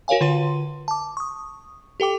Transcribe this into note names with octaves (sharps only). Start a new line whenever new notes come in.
F#4 A#4 C#5 F5 G#5
D3 F4 B4 C6
A5 D6
C#6 D#6
G4 A4 G5 D6